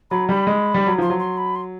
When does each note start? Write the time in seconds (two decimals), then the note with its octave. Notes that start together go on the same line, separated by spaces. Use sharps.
0.11 F#3 B5
0.29 G3 B5
0.47 G#3
0.74 G3
0.87 F#3
0.98 F3 C6
1.10 F#3
1.19 C6
1.38 B5
1.56 C6